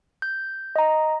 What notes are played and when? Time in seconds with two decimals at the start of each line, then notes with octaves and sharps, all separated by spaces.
0.22 G6
0.76 D#5 A#5